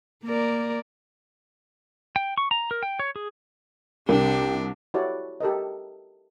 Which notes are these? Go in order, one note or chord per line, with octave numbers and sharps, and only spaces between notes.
A#3 A#4 D5
G5
C#6
A#5
A#4
G5
C#5
G#4
C2 C3 D4 G4 A#4
E4 F#4 G4 A4 C#5 D5
G4 A4 A#4 D#5